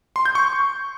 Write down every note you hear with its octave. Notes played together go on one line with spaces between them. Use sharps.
C6
G6
C#6